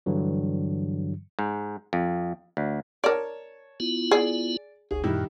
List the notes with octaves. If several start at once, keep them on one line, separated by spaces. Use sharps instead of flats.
G2 D3 E3 F#3
G#2
F2
D2
A#4 C#5 D5 A5
B3 E4 F4
G#4 D5
F#1 C#2 G#4
F#2 A#2 D#3 G3 E4